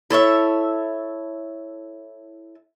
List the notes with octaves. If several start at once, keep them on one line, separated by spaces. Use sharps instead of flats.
E4 A4 C#5 E5